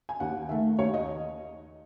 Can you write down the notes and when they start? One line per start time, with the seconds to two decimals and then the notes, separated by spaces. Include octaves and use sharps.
0.09 G#5
0.20 D#2 F#5
0.49 D#3 A3 E5
0.78 D#2 C#5
0.94 D#5